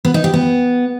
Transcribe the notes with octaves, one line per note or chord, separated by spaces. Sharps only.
B3
D#4
G4
B3